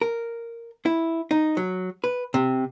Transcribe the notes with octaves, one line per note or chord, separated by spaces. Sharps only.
A#4
E4
D#4
F#3
B4
C3